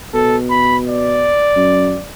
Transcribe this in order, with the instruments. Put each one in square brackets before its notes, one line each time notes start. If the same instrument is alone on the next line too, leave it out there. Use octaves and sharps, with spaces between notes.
[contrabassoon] B2 [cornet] A4
[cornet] B5
D5
[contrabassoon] F#2